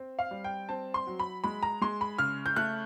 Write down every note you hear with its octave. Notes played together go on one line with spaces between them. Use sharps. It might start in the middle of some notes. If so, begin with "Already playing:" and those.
Already playing: C4
F5
G3
G5
C4 A5
C6
F#3
B5
G#3 B5
A#5
G#3 C6
B5
C#3 F6
G6
A3 F#6